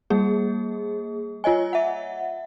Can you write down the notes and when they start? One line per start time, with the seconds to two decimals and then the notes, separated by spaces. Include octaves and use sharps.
0.10 G3 A#3 G#4
1.44 F4 C#5 D#5 G#5
1.73 E5 F#5